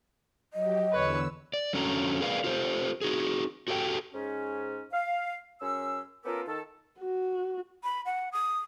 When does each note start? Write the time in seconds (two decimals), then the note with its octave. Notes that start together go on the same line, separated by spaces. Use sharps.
0.54 F#3 G4 D#5
0.92 E2 D3 B4 C#5 E6
1.53 D5
1.73 F2 D3 C#4 F#4 A4 A#5
2.21 G#4 A#4 B4 D5 F5
2.44 F4 G4 A4 C5
3.01 D#4 F#4 G#4
3.68 F#4 G4 A4 D5 G5
4.13 G#2 C#4
4.92 F5
5.61 F#2 C#4 G#4 E6
6.24 B3 C#4 F4 G4 A4 A#4
6.47 D#3 A4
7.00 F#4
7.84 B5
8.06 F#5
8.32 D#6